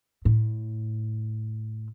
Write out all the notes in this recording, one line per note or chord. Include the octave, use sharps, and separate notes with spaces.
A2